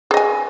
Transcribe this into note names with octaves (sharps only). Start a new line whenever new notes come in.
G#4 D#5 G#5